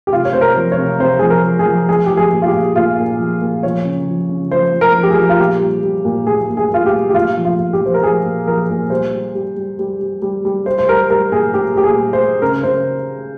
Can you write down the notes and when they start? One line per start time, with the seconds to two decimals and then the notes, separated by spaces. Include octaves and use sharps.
0.07 G4
0.13 C3 F4
0.25 C#5
0.33 C3 C5
0.41 A#4
0.57 F3
0.72 C#5
0.78 C3
1.00 C3 C5
1.19 F3 G#4
1.30 A#4
1.44 F3
1.59 G#4
1.66 F3
1.89 F3 G#4
2.06 F3 G4
2.17 G#4
2.33 A#2
2.42 F4
2.47 G4
2.54 A#2
2.76 A#2 F4
2.98 A#2
3.19 F3
3.41 A#2
3.63 F3 C#5
3.85 C#3
4.08 F3
4.29 C#3
4.51 F3 C5
4.73 F3
4.81 A#4
4.96 F3
5.03 G4
5.11 G#4
5.17 F3
5.29 F4
5.39 A#2 G4
5.61 G3
5.83 G3
6.05 A#2
6.27 A#2 G#4
6.49 A#2
6.57 G#4
6.71 A#2 F4
6.86 G4
6.93 G3
7.09 G4
7.14 A#2 F4
7.37 F3
7.45 F4
7.59 A#2
7.73 G4
7.81 F3 C5
7.94 A#4
8.03 F3 G#4
8.25 A#2
8.47 F3 A#4
8.69 A#2
8.90 G3 C5
9.12 G3
9.35 G3
9.57 G3
9.79 G3
10.01 G3
10.22 G3
10.45 G3
10.66 G3 C5
10.79 C5
10.88 G3 A#4
11.10 G3 A#4
11.32 A#2 G#4
11.54 A#2 G4
11.76 A#2 G4
11.84 G#4
11.98 G3
12.13 C5
12.20 G3
12.42 C#3 A#4
12.63 C#3 C5